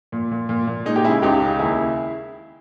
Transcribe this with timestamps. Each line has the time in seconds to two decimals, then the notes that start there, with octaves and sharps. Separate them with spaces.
0.12 A#2
0.32 A#2
0.49 A#2
0.67 A#2
0.86 G#3 D#4
0.96 D#4 G4
1.04 C#3 E4 G#4
1.22 C#2 D#4 G4
1.42 C#3
1.59 D#2 E4 G#4